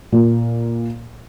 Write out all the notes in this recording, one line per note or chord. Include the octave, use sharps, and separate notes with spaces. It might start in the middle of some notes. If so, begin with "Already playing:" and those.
A#2